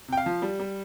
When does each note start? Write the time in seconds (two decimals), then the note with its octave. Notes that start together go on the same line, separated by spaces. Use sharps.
0.08 C3 G5
0.17 F5
0.26 F3
0.42 G3
0.60 G3